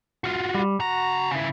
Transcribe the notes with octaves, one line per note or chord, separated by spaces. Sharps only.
F4 F#4
G3
C#3 F#4 A#5
C#3 E4